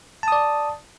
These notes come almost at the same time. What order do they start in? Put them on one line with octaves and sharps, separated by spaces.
A5 D#6 D5